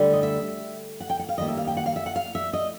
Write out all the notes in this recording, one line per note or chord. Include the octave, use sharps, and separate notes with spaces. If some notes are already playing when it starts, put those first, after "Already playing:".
Already playing: D2 D3 G3
D#5
E5
F#5
G5
F#5
F5
D#2 D#3 G3 A#3 D#5
E5
F5
G5
F#5
F5
E5
F#5
F5
E5
D#5